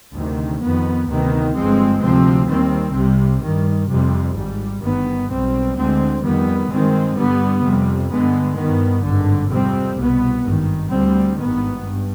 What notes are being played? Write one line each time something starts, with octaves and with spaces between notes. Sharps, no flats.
D2 C3 D#3
F2 D#3 B3
D2 C3 D#3 B3
G1 G2 F3 G#3 C4
D2 C3 F3 C4
D#2 D#3 G3 C4
C2 C3 G3
G2 D#3 G3
F2 C3 G3
G#1 G#2 G3
G1 G2 D#3 B3
B1 B2 G3 C4
D2 D3 G#3 C4
F2 D#3 G3 B3
G2 D#3 G#3 C4
G2 D3 G3 B3
F2 C3 G3
G2 D3 G#3 B3
G2 D#3 B3
G#1 G2 D3
F2 C3 G3 C4
C2 B2 B3
G#1 G2 D#3
D2 D3 G3 C4
G#1 G2 D#3 B3
G2